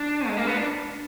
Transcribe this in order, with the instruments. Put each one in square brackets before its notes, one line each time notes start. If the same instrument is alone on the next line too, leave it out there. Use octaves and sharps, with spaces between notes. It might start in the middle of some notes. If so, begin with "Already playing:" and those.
Already playing: [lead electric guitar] D4
G#3
A#3
B3
D4